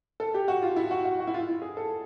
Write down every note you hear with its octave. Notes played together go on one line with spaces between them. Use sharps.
A4
G4
F#4
F4
E4
F#4
F#4
F#4
E4
F4
E4
G#4
A4